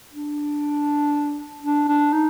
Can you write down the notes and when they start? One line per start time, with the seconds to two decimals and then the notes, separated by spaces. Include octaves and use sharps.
0.13 D4
1.63 D4
1.88 D4
2.13 D#4